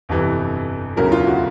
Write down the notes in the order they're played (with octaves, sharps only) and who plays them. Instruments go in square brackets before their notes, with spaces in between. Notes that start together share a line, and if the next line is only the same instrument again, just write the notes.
[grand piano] G1 F2 C3 E3
E1 D2 C#3 F#3 A#4
F4
F#4